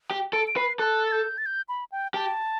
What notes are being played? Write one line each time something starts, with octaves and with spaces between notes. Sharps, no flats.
G4
A4 D7
D7
B4 C7
A4 F#6
A6
G6
A6
G6
B5
G5
G4 A5